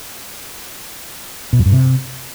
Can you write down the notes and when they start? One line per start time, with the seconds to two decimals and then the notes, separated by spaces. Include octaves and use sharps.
1.53 B2
1.59 F#2
1.66 G2
1.72 C3